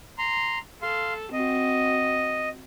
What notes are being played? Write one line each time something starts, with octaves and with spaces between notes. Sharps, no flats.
A#5 C6
A4 F5 C6
C4 F#4 D#5